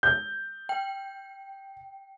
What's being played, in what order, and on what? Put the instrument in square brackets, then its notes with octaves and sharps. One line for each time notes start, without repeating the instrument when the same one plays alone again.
[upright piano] G6
[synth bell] G5